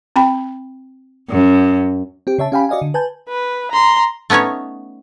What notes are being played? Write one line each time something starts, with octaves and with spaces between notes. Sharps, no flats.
C4 G5 B5
F#2
C4 G4
C#3 C#5 E5 A5
C#4 G4 F5 G5 G#5 B5
F#4 D5 D#5 F5 G#5
D3
B4 G#5 A5 G6
B4
A#5 C6
A3 B3 C#4 D#4 C#5